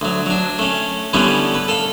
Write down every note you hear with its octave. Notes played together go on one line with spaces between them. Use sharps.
D2 F#3
F#3 D4
A3 C#4
D3 E3 G3 A3 B3 C#4
B4
A4 F5